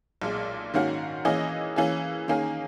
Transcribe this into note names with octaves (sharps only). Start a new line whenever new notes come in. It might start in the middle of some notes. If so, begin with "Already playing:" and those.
B1 A#2 G#3
G#2 D#3 A#3 C#4 F#4
E3 A#3 C#4 G#4 D#5
E3 A#3 C#4 G#4
D#3 A#3 C#4 G#4